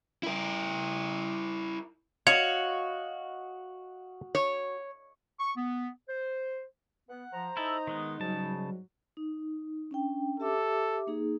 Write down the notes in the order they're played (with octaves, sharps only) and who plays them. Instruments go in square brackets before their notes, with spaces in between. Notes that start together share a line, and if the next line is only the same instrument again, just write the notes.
[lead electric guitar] E4 A#4
[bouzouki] F#4 [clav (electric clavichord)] C#5 [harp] D#5 F5
[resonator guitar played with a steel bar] C#5
[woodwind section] C#6
B3
C5
[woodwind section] B3 [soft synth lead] F#5
[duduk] F3 [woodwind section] C5 A#5
[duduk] D#4 [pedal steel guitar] E4 A4 [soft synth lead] D#5
[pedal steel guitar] D#3 G#3 B3
[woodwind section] G#2 G3 [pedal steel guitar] C#3 A5 [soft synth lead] F#3
[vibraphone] D#4
C#4 D4 G5
[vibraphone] G4 E5 D6 [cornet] A4
[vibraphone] A#3 D#4 G#4